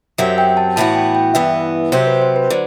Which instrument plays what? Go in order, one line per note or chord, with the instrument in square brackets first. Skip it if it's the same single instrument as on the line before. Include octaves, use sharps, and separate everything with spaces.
[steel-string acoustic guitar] F#2 F#3 C4 G4 [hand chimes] E5
[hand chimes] G5
A5
[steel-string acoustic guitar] A2 E3 B3 F#4 [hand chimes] A5
[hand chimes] G5
G5
[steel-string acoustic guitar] G2 E3 B3 [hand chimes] E5
[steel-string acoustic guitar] C3 F#3 C4 G4 [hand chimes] C5
[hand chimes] B4
C5
B4
[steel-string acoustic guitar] D3 F#3